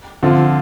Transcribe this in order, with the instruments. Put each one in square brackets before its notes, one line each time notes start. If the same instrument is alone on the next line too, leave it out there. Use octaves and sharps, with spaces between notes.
[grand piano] D3 F3 C4 F4